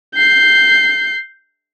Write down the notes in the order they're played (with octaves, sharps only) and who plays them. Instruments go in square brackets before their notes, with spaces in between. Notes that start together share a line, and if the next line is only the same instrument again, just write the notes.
[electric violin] G6 C7